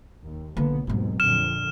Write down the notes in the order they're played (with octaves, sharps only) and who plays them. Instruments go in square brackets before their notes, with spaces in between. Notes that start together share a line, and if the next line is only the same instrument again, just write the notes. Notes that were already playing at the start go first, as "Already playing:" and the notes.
[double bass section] D#2
[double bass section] B1 B3 [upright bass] D3 A#3
[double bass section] D#2 G#2 B2 [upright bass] F#3 C4
[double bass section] F2 A#2 D3 [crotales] F6 E7